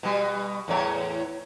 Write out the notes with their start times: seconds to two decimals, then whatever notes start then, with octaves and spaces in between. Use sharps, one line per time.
0.03 B2 G3
0.68 E2 A2 C#5